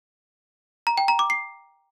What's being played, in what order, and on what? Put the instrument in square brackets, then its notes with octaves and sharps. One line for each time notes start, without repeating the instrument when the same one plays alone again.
[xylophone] A#5
G5
A#5
D6
C7